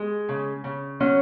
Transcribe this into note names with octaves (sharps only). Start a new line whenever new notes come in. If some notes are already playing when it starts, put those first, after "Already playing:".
Already playing: G#3
C#3
C#3
F#3 C#4